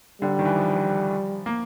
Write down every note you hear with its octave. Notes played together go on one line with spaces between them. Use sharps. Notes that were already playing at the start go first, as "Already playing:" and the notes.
D3 G3
D#3
E3
F3
A#3